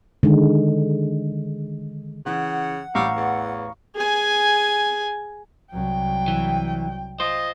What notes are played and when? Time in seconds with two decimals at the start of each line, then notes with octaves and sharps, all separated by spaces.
0.23 D3 D#3 G#3
2.26 C#3 E3 F#5
2.95 A1 G3 F5 A#5 C#6 E6
3.16 E2
3.95 G#4 G#5
5.73 C2 F#3 G5
6.28 E3
7.20 F4 C5 D#5